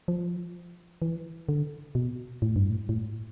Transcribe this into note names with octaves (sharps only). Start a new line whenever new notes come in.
F3
E3
D3
B2
A2
G2
A2
A2